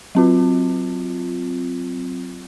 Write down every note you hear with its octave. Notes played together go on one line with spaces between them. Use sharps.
F#3 C4 F4